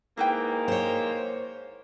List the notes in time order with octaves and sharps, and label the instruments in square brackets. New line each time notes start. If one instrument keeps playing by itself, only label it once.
[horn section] G#2 A#3 [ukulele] E4 B4 G5
[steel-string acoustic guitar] C5 C#5